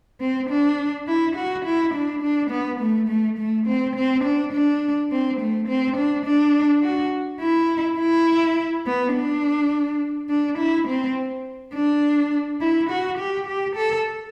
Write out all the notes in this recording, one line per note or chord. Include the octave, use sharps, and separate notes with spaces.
C4
D4
E4
F#4
E4
D4
D4
B3
A3
A3
A3
C4
C4
D4
D4
C4
A3
C4
D4
D4
F#4
E4
E4
B3
D4
D4
E4
C4
D4
E4
F#4
G4
G4
A4